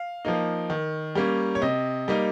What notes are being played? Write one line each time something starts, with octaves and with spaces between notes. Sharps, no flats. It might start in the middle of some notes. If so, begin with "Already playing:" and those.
Already playing: F5
F3 A#3 D#4
D#3
G3 A#3 C#4
C#5
C3 D#5
G3 A#3 D#4